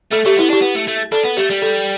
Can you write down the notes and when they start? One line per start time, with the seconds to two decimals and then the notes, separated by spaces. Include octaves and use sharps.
0.12 A3 A4
0.25 A3 G4
0.36 B3 E4
0.50 D4 G4
0.61 B3
0.75 A3
0.88 A3
1.12 D4 A4
1.25 B3
1.37 A3 G4
1.50 G3
1.62 A4